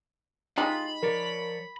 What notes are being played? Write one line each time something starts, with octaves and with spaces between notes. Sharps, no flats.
G#3 D#4 F4 G4 B5
F3 A#4 C#5 D5